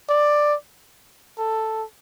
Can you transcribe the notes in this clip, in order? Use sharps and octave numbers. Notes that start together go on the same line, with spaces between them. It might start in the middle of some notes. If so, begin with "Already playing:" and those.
D5
A4